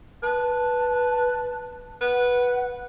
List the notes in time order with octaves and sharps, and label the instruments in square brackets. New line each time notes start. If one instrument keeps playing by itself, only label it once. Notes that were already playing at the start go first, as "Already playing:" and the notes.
[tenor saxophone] B4 [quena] A5
[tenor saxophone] B4 [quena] F#5